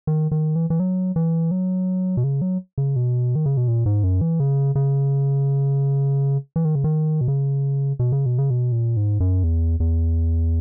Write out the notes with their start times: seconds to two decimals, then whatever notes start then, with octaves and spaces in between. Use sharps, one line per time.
0.07 D#3
0.31 D#3
0.56 E3
0.70 E3
0.79 F#3
1.16 E3
1.51 F#3
2.17 B2
2.24 C#3
2.42 F#3
2.78 C#3
2.96 B2
3.35 D#3
3.46 C#3
3.57 B2
3.68 A#2
3.86 G#2
4.03 F#2
4.21 E3
4.40 C#3
4.75 C#3
6.56 E3
6.65 D#3
6.75 C#3
6.84 D#3
7.21 B2
7.28 C#3
7.99 B2
8.12 C#3
8.26 B2
8.38 C#3
8.50 B2
8.72 A#2
8.96 G#2
9.20 F#2
9.43 E2
9.80 E2